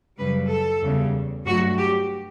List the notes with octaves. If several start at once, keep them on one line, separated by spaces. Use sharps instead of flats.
F#2 C#3 G3 B4
A4
E2 C#3 G3
G2 F#3 A3 F#4
G4